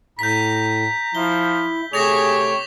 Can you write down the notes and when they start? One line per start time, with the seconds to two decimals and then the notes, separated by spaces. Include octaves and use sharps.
0.19 A2 A#5 G6 B6
1.15 F3 E4 G7
1.93 C3 A3 G4 G#4 C#5 D6 A#6 F7